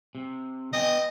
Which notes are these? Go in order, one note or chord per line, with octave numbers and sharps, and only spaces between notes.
C3
B3 D#5 G5 G#5